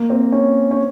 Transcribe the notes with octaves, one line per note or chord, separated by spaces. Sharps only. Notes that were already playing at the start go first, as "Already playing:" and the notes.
Already playing: A#3
C4
C#4
C#4